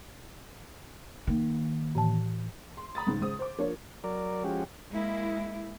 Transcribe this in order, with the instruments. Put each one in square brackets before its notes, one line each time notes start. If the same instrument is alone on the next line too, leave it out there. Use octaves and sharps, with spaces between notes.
[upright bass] D#3 A#3
[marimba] A2 E3 A5
[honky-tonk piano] C6
A#5 B5 D#6 A6
C#2 G#2
C#2 C5 D#6
C5 D6
F3 A#3 D4 F4 C#5
[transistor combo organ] F#3 A#4 D5
F3 G#3 C#4 F#4 G4
[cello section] G#3 A#3 E4